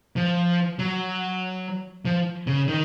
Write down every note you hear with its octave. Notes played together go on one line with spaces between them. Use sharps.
F3
F#3
F3
C#3
D#3